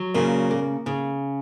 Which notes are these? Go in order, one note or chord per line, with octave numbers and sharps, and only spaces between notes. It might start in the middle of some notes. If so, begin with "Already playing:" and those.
Already playing: F#3
A#2 C#3
A#3
C#3